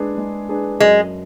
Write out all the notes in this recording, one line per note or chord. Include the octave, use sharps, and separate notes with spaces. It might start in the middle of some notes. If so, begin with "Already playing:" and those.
Already playing: G#3 D4 G#4 B4
G#3
D4 G#4 B4
F#2 G#3